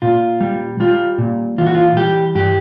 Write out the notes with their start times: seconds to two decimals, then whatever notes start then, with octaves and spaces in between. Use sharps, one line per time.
0.02 A#2 F4
0.41 G3
0.80 G3 F4
1.18 A#2
1.58 E3 F4
1.66 F#4
1.75 F4
1.97 G3 G4
2.35 G2 G4